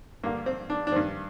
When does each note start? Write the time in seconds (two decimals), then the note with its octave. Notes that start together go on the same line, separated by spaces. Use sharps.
0.23 G2 D3 A#3
0.46 C4
0.70 D4
0.87 D4
0.92 G2 D#3 C4